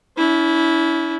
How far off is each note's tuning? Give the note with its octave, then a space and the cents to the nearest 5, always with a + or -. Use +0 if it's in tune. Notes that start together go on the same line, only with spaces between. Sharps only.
C#4 +45 E4 -10